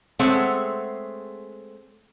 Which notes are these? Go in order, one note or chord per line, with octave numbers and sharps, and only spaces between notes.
G#3 A3 C4 G#4 C#5 F#5